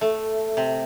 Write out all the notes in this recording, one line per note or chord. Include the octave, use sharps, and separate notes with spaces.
A3
C3